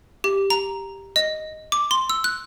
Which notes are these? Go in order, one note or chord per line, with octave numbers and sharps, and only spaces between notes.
G4
A#5
D#5
D6
C6
E6
F#6